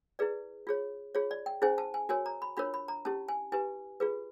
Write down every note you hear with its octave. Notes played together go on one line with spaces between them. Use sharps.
E4 G#4 B4 D5
F4 G#4 C#5
F4 G#4 C#5
D5
G5
C#4 E4 G#4 C5 G#5
A5
G#5
F#4 A#4 C#5 G#5
A#5
B5
D4 F4 A#4 C#5 B5
B5
A#5
C#4 E4 G4 A5
G#5
E4 G4 B4 G#5
F4 G#4 B4